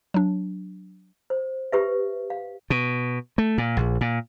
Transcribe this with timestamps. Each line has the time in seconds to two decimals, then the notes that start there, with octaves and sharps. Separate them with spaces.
0.14 F#3 D4
1.30 C5
1.72 G4 B4 E5
2.30 F5
2.70 B2
3.38 A3
3.58 A#2
3.77 A#1
4.01 A#2